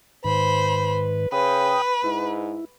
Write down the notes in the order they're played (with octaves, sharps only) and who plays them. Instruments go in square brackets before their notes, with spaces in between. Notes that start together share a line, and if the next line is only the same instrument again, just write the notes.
[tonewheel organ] G#2 D#3 [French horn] B4 [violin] C5 B5
[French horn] C#3 [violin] B4 [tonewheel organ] G5 D#6
[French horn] G#2 [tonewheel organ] E4